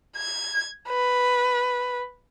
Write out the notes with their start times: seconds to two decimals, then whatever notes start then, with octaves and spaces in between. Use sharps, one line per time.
0.17 G#6
0.89 B4